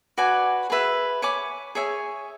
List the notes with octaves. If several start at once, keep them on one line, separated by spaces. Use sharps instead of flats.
F#4 B4 D5 G#5
G#4 B4 E5
C#5 G#5 B5 D6
G#4 C#5 E5 G#5